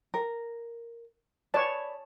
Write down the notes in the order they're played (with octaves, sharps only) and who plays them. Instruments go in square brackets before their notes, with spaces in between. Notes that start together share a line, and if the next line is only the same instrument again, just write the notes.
[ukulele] A#4
[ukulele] B4 D5 [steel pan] C#5 A5